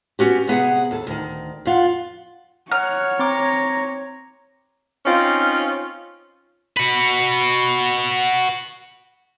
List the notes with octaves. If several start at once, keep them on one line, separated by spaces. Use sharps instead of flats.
B3 C#4 F#4 G4
C3 B3 G#4 F#5
D#2 A4
D2 D#3
F2 F4 F#5
C#5 F#5 A#5 F6
C4 A#5 C6 D6
C4 C#4 D#4 F4
F#4 B4